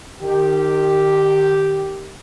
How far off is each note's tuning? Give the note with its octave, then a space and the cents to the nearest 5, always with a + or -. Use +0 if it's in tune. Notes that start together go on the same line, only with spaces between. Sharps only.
D#3 -25 G4 -5